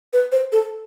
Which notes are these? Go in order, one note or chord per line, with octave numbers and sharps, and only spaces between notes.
B4
C5
A4